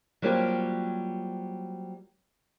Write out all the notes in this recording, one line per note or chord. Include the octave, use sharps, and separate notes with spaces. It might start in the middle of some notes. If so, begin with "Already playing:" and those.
F#3 G3 A#3 C4 F4 G4